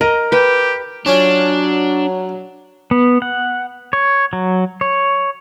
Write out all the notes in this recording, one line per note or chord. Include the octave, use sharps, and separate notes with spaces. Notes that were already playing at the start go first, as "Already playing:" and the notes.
A#4 D#5 A#5
G4 B4 G5
F#3 C#4 D4 F4 G#5
B3
F#5
C#5
F#3
C#5